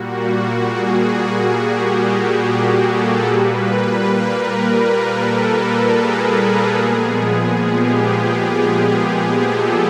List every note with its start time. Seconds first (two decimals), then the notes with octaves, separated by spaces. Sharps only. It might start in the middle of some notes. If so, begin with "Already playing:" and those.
Already playing: A#2 G3 A#3 F#4
0.21 F#4
0.64 G#4
1.52 G4
2.39 G#4
2.83 A4
3.26 A#2 G3 A#3 B4
4.14 A#4
5.01 A4
5.88 G#4
6.76 A#2 F3 G#3 B3
7.63 G4
8.50 G#4
9.38 A4